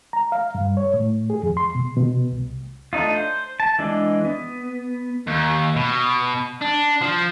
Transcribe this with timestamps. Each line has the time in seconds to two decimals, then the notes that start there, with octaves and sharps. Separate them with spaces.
0.13 A#5
0.32 F5
0.55 G2
0.77 C#5
0.94 A2
1.30 G#4
1.43 F2
1.57 C6
1.75 B2
1.97 B2
2.32 C2
2.93 A3 D4 D#4 F4
3.15 C5
3.60 A5
3.79 E3 G#3 D4
4.25 B3
5.27 D#2
5.76 B2
6.61 D4
7.01 F3